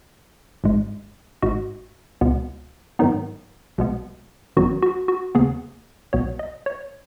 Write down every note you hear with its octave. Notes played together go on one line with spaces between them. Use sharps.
G#1 G#2 G#3
G#1 G#2 G#3 F#4
C#2 B2 G#3 B3
G#2 D#3 F#3 B3 D#4
B1 B2 G#3 B3
G#1 F#2 D#3 F#3 B3 F#4
F#4
F#4
D#2 C#3 B3 G#4
B1 B2 B3 C#5
D#5
C#5